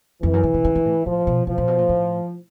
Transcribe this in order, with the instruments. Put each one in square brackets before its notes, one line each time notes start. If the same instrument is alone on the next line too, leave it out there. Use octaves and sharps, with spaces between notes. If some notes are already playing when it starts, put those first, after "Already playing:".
[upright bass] F2 [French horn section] E3
[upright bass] F#2
C3
C3
C#3
D3
A2
[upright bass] A2 [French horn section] F3
[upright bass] B2
[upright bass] B2 [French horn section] F3
[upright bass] A#2
B2
A#2
A2